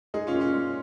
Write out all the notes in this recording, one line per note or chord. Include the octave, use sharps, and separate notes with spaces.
G#3 D#4 G#4
C#4 F4
A#2
C#4 F4
G#3